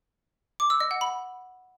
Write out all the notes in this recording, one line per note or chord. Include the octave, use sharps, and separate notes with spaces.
D6
E6
D#5
F#5
B5